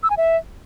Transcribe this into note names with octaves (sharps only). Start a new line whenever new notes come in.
E6
G#5
E5